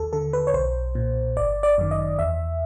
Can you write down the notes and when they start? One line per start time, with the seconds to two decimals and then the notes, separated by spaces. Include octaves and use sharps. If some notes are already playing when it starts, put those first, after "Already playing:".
Already playing: D#2 A4
0.13 D3 A4
0.33 B4
0.47 C#5
0.54 B1 C5
0.95 A#2
1.37 G1 D5
1.63 D5
1.78 F#2 D#3
1.91 D#5
2.19 E2 E5